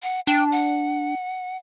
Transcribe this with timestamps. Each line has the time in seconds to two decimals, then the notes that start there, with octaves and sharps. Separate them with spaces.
0.03 F#5
0.27 D4 G5
0.52 F#5